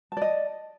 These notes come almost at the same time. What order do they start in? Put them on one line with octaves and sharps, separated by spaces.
A5 D5 D#5